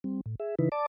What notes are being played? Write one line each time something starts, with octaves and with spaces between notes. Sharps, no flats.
G3 C4
A2
G#4 E5
C#3 E3 D#4 E4 B4
D5 A5 D6